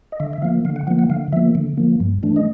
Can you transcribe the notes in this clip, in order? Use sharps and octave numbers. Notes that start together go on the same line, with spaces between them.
D#5
D3 E5
E5
F3 A#3 F5
D3 F5
F#5
F3 A#3 F#5
F#5
D3 F5
F3 A#3 E5
D3
F3 A#3
G2
E3 A3 D4
D#5